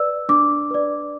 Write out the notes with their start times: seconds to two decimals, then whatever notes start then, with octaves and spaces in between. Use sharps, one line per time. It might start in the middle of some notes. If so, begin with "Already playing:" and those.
Already playing: B4 D5 E6
0.29 D4 D6
0.71 B4 D5